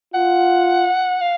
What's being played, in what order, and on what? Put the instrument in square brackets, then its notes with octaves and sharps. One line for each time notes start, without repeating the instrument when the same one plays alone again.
[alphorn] F4 [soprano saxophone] F#5
[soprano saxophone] F5